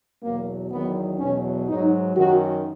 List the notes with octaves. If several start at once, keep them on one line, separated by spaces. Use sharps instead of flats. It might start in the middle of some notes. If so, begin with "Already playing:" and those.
E2 B2 F#3 A#3
E2 D#3 F#3 B3
E2 B2 F#3 C#4
G#2 F#3 D#4
F#2 D#3 F#3 F#4